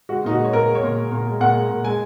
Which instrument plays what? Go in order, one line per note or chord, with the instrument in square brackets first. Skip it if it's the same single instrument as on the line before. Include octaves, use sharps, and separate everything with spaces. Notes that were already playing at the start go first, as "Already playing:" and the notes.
[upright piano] G#3 F#4
A#2 D#4
F#4
G#3
C#5
A#2 A#4
G#3
C#5
A#2
G#3
A#2
G#3
A#2 F#5
G#3
A#2
G#3 G#5